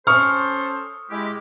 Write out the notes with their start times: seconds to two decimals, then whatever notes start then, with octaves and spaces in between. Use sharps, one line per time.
0.07 C#4 A4 C5 C#6 D#6 F6
1.11 G#3 E4 G4